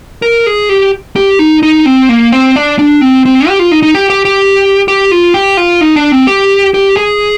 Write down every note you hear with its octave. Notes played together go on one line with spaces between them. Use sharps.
A#4
G#4
G4
G4
D#4
D#4
C4
A#3
C4
D4
D4
C4
C4
G4
F4
D#4
D#4
G4
G4
G4
G4
F4
G4
F4
D#4
D4
C4
G4
G4
G#4